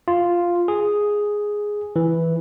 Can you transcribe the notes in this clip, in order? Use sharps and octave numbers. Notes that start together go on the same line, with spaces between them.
F4
G#4
E3